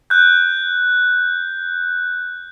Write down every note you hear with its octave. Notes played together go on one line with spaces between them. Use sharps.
F#6 G6